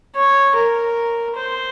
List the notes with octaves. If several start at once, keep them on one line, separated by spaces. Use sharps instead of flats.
C#5
A#4
C5